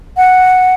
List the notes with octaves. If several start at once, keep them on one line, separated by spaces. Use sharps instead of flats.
F#5